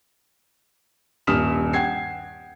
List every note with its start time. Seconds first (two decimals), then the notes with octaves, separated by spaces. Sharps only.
1.27 D#1 G2 D#6 F6 B6 E7
1.73 F#5 G5 G#6 C7